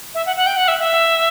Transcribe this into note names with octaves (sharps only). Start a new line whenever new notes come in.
E5
F#5
F#5
G5
F#5
E5
E5